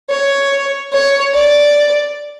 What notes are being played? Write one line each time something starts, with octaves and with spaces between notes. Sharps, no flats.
C#5
C#5
D5